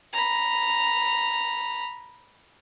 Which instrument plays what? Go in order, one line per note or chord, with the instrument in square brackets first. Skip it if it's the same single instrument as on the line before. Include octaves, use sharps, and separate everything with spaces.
[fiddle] A#5 B5